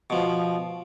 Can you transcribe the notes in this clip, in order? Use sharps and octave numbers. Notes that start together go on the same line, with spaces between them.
B2 F3